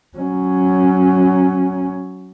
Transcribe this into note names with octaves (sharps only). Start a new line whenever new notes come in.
F#3 C#4